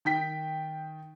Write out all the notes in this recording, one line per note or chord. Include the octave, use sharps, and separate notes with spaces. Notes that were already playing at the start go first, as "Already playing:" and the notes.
D#3 G5 B6